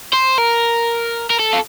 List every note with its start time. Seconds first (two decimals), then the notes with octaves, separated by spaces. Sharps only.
0.13 C5
0.38 A#4
1.30 A#4
1.39 A4
1.53 F4